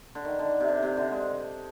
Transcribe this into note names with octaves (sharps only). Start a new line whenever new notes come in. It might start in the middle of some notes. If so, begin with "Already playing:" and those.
D3
D#3
D3
C3
D3
C3
D3
G#3